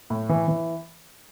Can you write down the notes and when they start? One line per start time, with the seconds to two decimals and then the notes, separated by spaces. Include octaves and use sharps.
0.10 A2
0.29 E3
0.48 E3